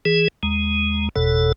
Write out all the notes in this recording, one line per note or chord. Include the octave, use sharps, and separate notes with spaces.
E3 G#4
D#2 G#3
F#1 E2 B2 A4